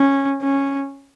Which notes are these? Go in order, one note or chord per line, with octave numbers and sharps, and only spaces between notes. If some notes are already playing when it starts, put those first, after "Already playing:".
Already playing: C#4
C#4